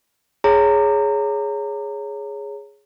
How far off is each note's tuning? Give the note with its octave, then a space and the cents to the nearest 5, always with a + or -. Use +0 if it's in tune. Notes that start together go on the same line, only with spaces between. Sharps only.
G#4 +0 C#5 +0 A#5 -25